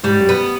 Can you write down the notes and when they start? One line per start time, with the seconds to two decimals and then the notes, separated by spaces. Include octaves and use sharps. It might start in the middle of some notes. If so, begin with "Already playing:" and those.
0.03 G#2 G3
0.20 F#2
0.29 B3